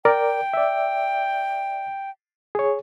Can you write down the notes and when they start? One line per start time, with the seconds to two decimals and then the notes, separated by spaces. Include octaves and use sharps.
0.05 A#4 D5 G5
0.53 D5 E5
2.55 G#4 C#5